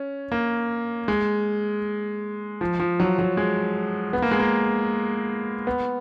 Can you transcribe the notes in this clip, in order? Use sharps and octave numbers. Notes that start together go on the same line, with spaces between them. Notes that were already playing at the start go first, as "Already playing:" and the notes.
Already playing: C#4
A#3
G#3
F3
F3
F#3
F#3
G#3
B3
A#3
G#3
A#3
B3